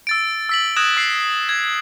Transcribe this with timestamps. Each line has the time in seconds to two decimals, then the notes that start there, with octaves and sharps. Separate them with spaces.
0.07 E6 A6 D7
0.49 E6 B6 F#7
0.76 D#6 F#6 G#6 A#6 E7
0.97 E6 C7
1.49 G#6